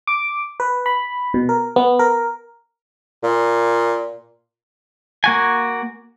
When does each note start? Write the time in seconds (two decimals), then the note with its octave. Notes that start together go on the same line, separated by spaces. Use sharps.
0.07 D6
0.60 B4
0.86 B5
1.34 B2
1.49 A#4
1.76 B3
1.99 A#4
3.23 A#2
5.24 A#3 F#4 G#5